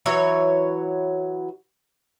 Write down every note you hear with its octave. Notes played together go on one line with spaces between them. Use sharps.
E3 F#3 C#5